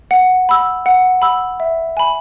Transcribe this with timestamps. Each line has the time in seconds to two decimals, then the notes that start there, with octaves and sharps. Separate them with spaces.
0.11 F#5
0.49 B5 E6
0.86 F#5
1.22 B5 E6
1.60 E5
1.97 G#5 B5